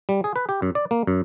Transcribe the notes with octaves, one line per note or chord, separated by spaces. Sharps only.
G3
G#4
B4
G4
F#2
D5
A#3
F#2